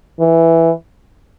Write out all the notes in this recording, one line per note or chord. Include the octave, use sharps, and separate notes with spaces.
E3